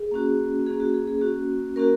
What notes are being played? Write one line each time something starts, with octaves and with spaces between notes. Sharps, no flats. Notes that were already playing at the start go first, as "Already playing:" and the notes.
Already playing: G#4
A#3 C#4 F#4
A#3 C#4 F#4 G#4
F#4
G#4
G#4
A#3 C#4 F#4
A#3 C#4 F#4 A#4